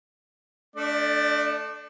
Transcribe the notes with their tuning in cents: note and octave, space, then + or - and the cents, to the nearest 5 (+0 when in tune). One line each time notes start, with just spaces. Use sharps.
A3 +0 D4 -5 D5 +35